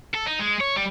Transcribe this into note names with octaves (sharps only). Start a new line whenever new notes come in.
A4
D#4
G#3
C#5
G3